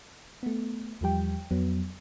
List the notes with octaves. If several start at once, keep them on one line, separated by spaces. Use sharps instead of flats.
A3 B3
E2 F3 G3 G4 G5
F2 F#3 B3